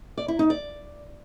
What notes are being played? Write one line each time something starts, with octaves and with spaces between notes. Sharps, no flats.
D5
E4
D#4
D5